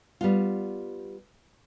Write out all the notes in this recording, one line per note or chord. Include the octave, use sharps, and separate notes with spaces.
G3 B3 F4